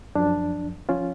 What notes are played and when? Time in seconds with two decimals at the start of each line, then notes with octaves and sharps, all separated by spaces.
0.16 F#2 F3 D4
0.89 F3 C#4 F4